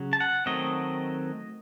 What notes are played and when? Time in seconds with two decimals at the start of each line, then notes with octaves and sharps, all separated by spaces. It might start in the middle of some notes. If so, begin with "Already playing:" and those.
Already playing: C#3 F#3
0.13 A5
0.20 F#5
0.46 D#3 F#3 A3 C4 D#5